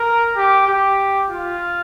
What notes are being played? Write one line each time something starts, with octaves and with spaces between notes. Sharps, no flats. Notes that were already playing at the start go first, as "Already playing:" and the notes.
Already playing: A#4
G4
G4
F4